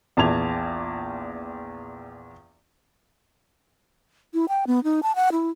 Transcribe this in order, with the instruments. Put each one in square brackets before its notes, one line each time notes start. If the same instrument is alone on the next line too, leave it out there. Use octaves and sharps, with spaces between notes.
[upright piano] A#1 E2 A#2 A5 G#6 F7
[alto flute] E4
G5
B3
D#4
A5
F#5
E4